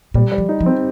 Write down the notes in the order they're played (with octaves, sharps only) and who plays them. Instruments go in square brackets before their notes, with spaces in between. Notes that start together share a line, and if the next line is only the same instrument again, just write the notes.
[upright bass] A#2 [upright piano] G3
[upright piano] G3
[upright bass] F3
[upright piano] D#4
[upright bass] F3
[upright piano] C4